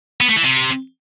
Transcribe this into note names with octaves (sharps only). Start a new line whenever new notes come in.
B3
A3
E3
C3